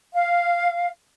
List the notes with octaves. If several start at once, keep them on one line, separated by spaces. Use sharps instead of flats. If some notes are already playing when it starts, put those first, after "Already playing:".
F5